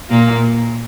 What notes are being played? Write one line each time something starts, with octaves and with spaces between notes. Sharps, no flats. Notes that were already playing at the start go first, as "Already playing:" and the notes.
A#2 A#3